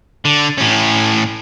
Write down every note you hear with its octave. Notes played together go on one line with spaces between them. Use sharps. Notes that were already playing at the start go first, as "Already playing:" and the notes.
D3
A2 C#4